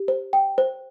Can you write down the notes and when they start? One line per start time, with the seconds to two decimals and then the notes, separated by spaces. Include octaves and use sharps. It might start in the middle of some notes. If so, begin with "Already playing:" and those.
Already playing: G4
0.08 C5
0.33 G5
0.58 C5